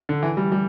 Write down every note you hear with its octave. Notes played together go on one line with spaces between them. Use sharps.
D3
E3
G3
G3